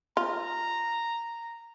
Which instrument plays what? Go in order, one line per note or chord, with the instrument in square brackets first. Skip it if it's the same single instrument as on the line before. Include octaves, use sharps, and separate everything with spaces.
[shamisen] F4 [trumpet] A#5